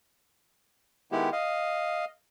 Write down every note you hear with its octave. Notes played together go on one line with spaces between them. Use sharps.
D#3 G#3 B3 E4 G4
D#5 F5